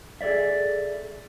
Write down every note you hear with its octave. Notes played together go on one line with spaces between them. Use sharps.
G#4 A4 B4 D5 E5